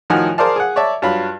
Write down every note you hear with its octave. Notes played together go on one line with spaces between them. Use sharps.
A2 D#3 F3 F#4 G#5
G#4 A#4 C5 D5 F5 A5
G#4 F#5
C#5 D5 E5 A5
G2 F#3 F4 B5